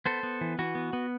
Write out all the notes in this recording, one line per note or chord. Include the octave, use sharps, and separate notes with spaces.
B3 A4 C5
B3
E3
E3 F#4
B3
B3